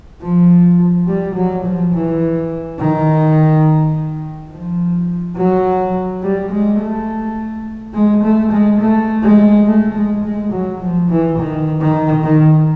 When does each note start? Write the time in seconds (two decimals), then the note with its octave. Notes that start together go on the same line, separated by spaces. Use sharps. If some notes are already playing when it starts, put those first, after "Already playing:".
0.22 F3
1.07 G3
1.35 F#3
1.65 F3
1.93 E3
2.79 D#3
4.51 F3
5.37 F#3
6.23 G3
6.51 G#3
6.80 A3
7.94 G#3
8.24 A3
8.52 G#3
8.80 A3
9.23 G#3
9.67 A3
9.94 G#3
10.24 G#3
10.52 F#3
10.80 F3
11.10 E3
11.38 D#3
11.81 D#3
12.24 D#3